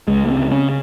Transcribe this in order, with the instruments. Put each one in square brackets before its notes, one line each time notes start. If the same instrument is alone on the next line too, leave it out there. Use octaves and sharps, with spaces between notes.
[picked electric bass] C#2 G#3
A#3
C4
C#3
C#4